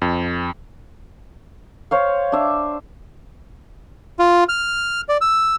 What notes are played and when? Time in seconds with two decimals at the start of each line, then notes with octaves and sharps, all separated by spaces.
0.02 F2
1.91 C5 C#5 F5
2.32 D4 E5
4.19 F4
4.49 F6
5.09 D5
5.21 E6